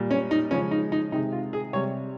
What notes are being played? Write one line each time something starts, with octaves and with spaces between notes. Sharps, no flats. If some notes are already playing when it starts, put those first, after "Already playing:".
Already playing: A#2 G3
C#4
D#4
C#3 F3 G#3 C#4
D#4
D#4
C3 D#3 G#3 D#4
F4
G#4
C3 G3 C#5